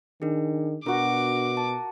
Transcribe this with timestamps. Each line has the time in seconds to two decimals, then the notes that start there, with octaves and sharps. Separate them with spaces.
0.22 D#3 D4 G#4
0.86 B2 D4 F#4 A#4 D6
1.57 A5